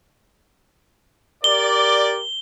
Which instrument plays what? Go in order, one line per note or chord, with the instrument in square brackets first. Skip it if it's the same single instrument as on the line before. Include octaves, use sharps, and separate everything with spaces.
[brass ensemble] G4 A#4 D5 [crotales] G7